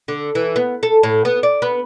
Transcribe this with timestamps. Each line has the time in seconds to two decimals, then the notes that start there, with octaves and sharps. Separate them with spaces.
0.08 D3
0.35 E3
0.56 B3
0.83 A4
1.03 A2
1.25 B3
1.43 D5
1.62 B3